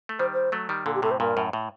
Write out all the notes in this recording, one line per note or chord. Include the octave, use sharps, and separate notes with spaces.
A3
D#3 G3 C5
C5
F#3 A3
D#3 G3
A#2 D3 A4
G4
A2 C3 A4
C5
G2 A#2 A#4
F#2 A2
A2